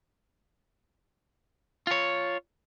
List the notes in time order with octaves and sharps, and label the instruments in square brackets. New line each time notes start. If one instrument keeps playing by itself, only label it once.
[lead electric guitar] F4 C#5